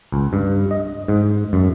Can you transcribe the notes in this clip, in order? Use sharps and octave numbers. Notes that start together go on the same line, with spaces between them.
C#2
G2
D#5
G#2
F#2